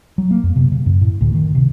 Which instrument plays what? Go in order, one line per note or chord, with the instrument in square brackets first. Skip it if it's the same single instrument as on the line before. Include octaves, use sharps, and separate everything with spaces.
[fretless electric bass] F#3
A#3
F2
C3
C#3
F#2
A2
D2
D#3
C3